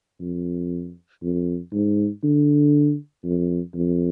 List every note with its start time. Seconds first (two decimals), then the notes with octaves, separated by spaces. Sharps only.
0.21 F2
1.22 F2
1.73 G#2
2.24 D3
3.24 F2
3.75 F2